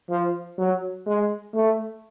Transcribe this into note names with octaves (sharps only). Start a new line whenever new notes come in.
F3
F#3
G#3
A3